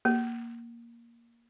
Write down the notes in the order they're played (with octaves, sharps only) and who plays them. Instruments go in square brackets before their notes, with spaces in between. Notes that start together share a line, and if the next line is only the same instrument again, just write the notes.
[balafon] A#3